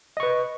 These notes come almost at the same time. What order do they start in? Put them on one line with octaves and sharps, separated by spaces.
D#5 C#6 B4